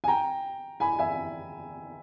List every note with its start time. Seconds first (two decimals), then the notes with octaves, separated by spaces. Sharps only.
0.04 G#5
0.08 G5 A#5
0.80 G#5 B5
0.99 E5 G#5